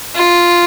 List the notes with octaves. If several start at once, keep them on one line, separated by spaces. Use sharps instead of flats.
F4